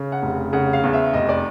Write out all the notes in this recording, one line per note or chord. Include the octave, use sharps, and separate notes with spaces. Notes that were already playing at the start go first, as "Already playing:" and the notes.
Already playing: C#3
F#5
F1
C#3 F#5
F5
E2
E5
F1 D#5
D5